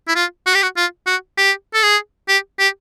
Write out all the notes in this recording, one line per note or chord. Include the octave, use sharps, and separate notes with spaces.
E4
F4
F#4
G4
F#4
F4
F#4
G4
A4
G#4
G4
G4